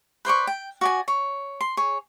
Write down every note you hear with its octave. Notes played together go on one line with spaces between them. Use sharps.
B4 C5 D5 C#6
G5
F#4 D5 G#5
C#5
C6
G#4 C#5